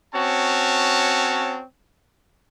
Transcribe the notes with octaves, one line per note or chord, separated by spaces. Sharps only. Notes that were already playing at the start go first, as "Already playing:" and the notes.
C4 C#4 F#4 C#5 A5